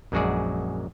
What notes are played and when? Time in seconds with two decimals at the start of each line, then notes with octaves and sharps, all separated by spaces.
0.12 A#1 F#2 G#3 F#4 G#4 D5